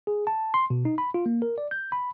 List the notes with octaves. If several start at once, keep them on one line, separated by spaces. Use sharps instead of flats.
G#4
A5
C6
B2
D#4
B5
F4
A#3
A#4
D5
G6
B5